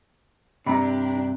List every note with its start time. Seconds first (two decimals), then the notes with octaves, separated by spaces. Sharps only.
0.66 G2 C3 D4 G4 A#5 B5